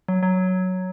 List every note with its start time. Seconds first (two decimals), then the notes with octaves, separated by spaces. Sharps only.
0.08 F#3
0.23 F#3